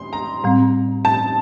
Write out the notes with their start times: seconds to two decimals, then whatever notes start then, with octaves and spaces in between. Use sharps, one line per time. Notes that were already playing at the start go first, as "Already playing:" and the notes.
Already playing: C6
0.13 A#5
0.44 A2 G3 C4
1.05 A5